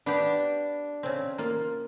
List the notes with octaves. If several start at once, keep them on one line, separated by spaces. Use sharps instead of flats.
B3 D4 G4
C#3 C4
A#3 F4